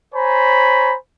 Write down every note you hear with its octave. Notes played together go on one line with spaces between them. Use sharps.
C5 C#5 G#5 A#5 B5